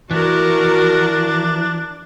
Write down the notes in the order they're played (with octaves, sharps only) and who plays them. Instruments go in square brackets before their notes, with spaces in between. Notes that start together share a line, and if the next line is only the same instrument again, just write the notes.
[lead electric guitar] E3 [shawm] D4 [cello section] F#4 A#4